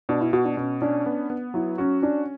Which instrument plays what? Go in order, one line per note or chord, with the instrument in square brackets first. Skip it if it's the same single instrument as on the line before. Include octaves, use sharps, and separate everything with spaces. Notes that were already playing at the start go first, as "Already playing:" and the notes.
[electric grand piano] B2 [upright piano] D4
[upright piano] E4
[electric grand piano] B2 [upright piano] F#4
[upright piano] D4
[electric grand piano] B2 [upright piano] C#4
[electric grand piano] C#4 [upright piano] D4
[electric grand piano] B3
B3
[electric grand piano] F#3 [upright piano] E4
[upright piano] C#4 [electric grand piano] F#4
[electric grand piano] C#4 [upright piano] D4